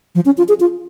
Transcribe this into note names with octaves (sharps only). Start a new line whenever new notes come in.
F3
C#4
F4
G#4
F4